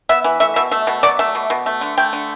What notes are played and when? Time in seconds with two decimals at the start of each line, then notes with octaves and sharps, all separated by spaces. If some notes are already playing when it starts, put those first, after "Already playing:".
0.09 B3 E5
0.24 E3
0.40 A3 E5
0.56 B2 E5
0.71 A3 E5
0.87 B2
1.03 F#3 D5
1.19 A3 E5
1.35 B2
1.50 B2
1.66 A3
1.81 D3
1.98 A3 G5
2.13 D3